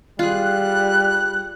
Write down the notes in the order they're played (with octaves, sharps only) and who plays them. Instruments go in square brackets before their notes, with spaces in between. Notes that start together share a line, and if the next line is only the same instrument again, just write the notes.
[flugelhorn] G3 [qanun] F4 G#4 [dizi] F#6